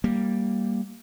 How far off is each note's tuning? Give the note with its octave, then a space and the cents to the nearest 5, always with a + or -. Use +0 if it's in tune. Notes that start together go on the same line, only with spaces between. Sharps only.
G3 +0 A#3 -5